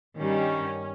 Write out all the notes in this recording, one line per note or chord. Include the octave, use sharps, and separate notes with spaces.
G2 D#3 G3 C#4